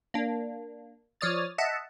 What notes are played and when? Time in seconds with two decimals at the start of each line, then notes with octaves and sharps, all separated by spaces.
0.14 A#3 D4
1.21 F3 C#5 D5 D#6 F6 A6
1.58 D#5 E5 F#5 A5